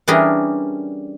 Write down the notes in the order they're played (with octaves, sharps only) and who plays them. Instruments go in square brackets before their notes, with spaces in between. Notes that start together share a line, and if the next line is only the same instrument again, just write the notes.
[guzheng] E3 G3 C#4 D4 G#4 A#4